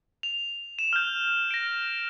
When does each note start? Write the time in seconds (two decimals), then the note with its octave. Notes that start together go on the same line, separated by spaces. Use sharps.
0.23 F7
0.79 E7
0.93 F6 G6
1.51 A#6 D7